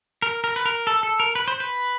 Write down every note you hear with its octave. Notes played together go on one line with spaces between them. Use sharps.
A#4
A#4
B4
A#4
A4
A4
A#4
B4
C5
B4